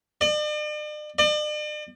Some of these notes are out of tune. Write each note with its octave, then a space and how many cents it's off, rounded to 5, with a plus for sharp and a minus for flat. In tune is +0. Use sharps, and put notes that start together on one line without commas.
D5 +45
D5 +45